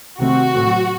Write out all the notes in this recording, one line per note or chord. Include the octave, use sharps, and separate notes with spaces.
C3 D#3 A3 C4 F#4
A2 F#3 A3 C4